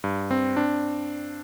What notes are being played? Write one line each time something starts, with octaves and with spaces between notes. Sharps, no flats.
G2
C4
D4